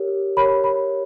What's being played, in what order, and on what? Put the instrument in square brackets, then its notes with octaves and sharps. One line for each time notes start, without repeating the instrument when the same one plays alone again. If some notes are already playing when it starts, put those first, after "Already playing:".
Already playing: [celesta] G4 A#4 C#5
G4 A#4 C#5 B5
B5